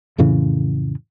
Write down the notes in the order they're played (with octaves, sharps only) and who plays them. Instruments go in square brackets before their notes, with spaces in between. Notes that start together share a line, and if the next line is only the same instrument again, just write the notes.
[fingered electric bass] F2 A2 C#3 E3